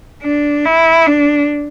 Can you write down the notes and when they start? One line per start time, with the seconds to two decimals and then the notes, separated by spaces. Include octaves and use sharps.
0.23 D4
0.65 E4
1.06 D4